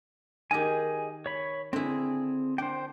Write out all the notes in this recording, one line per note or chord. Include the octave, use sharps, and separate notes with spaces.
D#3 G4 G#4 D#5 G#5
C#5 B5
D3 C4 E4 G#4
D4 C5 G5